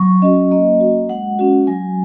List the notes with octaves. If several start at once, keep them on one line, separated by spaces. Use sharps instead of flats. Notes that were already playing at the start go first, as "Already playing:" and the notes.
Already playing: F#3 C#6
C#4 F#4 D#5
A#3 D#5
F#4
G#3 F#5
C#4 F#4
F#3 G#5